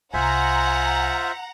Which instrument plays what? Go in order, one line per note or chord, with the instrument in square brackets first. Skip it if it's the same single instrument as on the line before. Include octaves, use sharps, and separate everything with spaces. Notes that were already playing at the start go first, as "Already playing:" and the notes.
[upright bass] C2 [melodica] F4 C5 E5 [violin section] F#5 A#5 [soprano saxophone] G#5